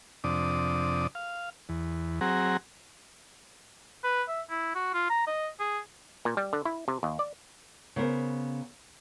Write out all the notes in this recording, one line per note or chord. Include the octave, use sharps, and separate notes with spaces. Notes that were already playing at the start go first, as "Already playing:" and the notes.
F2 C3 D4 D5 D#6
F5
E2
F#3 C4 G#4 F#5 A#5
B4
E5
E4
F#4
F4
A#5
D#5
G#4
A#2
G3
D3
E4
C3
D#2
D5
C#3 B3 A#4 C5